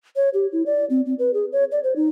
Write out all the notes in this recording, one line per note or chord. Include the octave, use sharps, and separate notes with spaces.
C#5
G4
E4
D5
C4
C4
B4
G#4
C#5
D5
C5
D#4